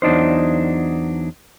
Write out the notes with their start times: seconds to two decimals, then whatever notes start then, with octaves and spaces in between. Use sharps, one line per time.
0.02 E2 F#3 D4 D#4 C5